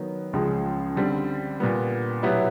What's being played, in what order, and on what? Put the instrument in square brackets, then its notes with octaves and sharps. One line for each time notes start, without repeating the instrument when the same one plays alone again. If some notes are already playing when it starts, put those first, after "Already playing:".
Already playing: [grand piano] D#3 F#3 B3
C#2 C#3 F3 G#3
D3 G3 C4
A#2 G3 B3
B2 F#3 B3 E4 G4